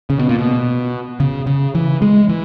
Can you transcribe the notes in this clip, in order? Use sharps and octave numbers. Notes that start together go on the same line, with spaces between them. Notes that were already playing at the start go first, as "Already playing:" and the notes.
C#3
B2
A#2
B2
C#3
C#3
E3
G#3
E3